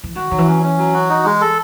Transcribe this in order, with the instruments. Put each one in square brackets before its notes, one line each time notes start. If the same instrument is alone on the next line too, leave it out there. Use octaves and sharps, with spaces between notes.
[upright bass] E3
[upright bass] D#3 [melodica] F#4
[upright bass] D#3 [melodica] F#3
[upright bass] E3
[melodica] C#4
C#4
F#3
F#4
D#4
G#3
A4